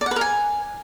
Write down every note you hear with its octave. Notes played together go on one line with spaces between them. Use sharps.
D5
F#5
B4
A#4
G#5